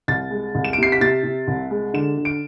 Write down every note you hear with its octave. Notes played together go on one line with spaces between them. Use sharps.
C2 A6
G#3
C2
E7
D7
C3 C7
B6
C3 A6
C3
C2
G#3
D3 E7
D3
D7